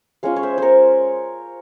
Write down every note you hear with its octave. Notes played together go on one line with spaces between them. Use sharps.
G#3 C#4 F4 C#5 F5
C#5
C5 E5
A#4 C5 C#5